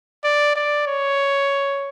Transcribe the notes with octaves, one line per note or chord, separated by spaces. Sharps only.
D5
D5
C#5